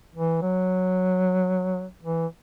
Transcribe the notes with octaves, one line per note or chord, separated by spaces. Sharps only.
E3
F#3
E3